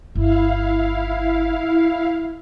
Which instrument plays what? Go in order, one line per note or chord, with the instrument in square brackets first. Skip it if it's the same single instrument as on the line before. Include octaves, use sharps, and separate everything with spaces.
[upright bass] G1 [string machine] E4 F5